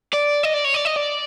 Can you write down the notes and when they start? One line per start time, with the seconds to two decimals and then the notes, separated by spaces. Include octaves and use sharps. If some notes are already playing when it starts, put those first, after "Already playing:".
0.14 D5
0.44 D#5
0.54 D5
0.65 C#5
0.75 D5
0.86 D#5
0.96 D5